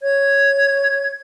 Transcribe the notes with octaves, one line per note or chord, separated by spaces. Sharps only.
C#5 G#6